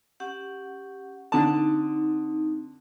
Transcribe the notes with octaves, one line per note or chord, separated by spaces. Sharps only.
C#4 G4 F#5
D3 C4 D#4 A5